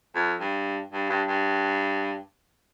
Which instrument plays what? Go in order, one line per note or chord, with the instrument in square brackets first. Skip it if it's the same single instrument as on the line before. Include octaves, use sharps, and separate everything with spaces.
[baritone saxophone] F2
G2
G2
G2
G2